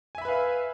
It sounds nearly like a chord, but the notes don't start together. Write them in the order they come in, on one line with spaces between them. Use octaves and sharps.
G#5 E5 B5 B4 F5